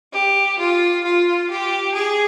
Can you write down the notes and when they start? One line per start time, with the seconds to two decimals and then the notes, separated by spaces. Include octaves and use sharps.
0.13 G4
0.58 F4
1.03 F4
1.49 G4
1.94 G#4